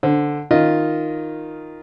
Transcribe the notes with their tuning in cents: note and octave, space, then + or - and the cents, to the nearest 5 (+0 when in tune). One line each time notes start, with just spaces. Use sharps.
D3 +0 C5 +5
D#3 +0 F4 +0 D#5 +0